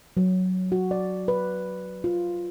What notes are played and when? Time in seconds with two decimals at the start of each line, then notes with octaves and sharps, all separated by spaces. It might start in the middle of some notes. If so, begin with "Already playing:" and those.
0.17 F#3
0.72 F#4
0.91 D5
1.28 B4
2.04 F4